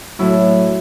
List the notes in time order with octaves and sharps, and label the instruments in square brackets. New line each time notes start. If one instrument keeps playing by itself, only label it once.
[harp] A2 F#3 E4